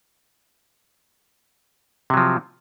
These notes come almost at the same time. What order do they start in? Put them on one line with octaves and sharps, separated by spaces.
C3 F#3 F3